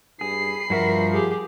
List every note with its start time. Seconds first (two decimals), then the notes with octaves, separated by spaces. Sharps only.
0.21 G2 G#4 B5 C7
0.70 G2 F3 F#4 A#4 E5
1.13 G4 G#4